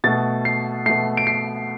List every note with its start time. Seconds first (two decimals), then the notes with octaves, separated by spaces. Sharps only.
0.04 B2 A3 A6
0.45 C7
0.86 B2 A3 C7
1.17 D7
1.27 C7